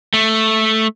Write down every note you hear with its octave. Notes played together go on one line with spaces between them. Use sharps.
A3